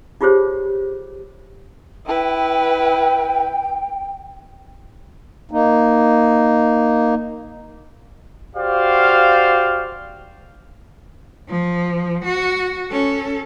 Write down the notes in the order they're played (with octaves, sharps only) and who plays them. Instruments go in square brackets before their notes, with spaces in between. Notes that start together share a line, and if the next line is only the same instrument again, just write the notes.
[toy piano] D#4 F4 G4 G#4 C5 C#5
[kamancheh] E4 B4 [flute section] G5
[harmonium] A#3 D#4
[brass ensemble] F#4 G4 C5 D5 F5
[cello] F3
F#4
C#4 A4